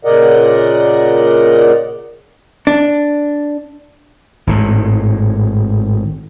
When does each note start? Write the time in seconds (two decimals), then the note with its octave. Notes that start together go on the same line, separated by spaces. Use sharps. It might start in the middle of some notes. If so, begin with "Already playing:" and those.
0.05 A#2 C#3 A#4 D5 D#5 F#5
2.67 D4
4.47 G#1 A2